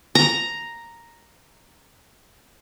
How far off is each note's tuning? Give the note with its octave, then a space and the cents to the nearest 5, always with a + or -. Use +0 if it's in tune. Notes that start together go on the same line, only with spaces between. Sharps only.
A#5 +0